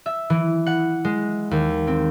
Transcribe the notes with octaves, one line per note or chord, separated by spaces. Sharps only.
E5
E3
F#5
G#3
D#2
C4